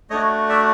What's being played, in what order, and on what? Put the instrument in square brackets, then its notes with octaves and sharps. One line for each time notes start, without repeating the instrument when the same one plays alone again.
[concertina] A3 D4 F#4 C#5 D#5
D5 E5